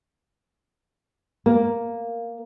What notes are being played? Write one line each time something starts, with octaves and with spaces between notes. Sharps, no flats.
A#3